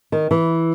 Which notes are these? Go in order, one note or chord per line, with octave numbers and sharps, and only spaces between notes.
D#3
E3